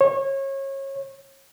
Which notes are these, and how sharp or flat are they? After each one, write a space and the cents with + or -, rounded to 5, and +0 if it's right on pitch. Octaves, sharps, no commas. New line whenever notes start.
C#5 -30